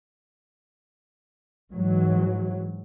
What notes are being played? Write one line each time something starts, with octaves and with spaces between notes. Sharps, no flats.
G#2 E3 F#3